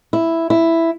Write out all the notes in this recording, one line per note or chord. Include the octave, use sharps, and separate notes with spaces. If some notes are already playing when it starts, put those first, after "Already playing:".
E4
E4